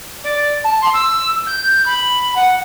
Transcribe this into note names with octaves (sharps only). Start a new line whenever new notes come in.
D5
A5
C6
E6
G6
B5
F#5